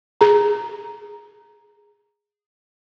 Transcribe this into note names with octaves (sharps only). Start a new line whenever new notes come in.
G#4 A#5